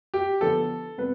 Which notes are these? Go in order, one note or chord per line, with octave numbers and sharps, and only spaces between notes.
G4
D3 F3 B3 A4
C3 G3 B3 B4